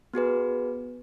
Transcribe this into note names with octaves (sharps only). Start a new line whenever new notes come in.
B3 F#4 G#4 B4